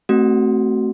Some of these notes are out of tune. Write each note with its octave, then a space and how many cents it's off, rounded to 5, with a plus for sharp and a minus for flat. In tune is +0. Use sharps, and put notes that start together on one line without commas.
A3 +0 C4 +0 F#4 +20